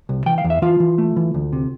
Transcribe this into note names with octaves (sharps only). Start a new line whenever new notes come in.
C2
E3 G5
F5
E2
E5
E3 F4 F5
E3
A3
E3
D2
C3